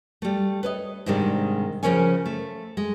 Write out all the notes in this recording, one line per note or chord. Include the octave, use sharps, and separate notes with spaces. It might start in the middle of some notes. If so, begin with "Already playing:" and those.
G3 A3
B4 C#5 D#5
G#2 C3 D#3 G3 G#3 D4
C#3 F3 C#4 A#4 C#5 G#5
A3
G#3